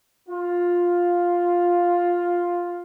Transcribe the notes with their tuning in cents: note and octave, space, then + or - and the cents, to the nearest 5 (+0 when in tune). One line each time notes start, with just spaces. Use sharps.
F4 +5